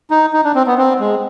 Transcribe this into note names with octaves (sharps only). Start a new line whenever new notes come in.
D#4
D#4
D4
C4
B3
C4
G#3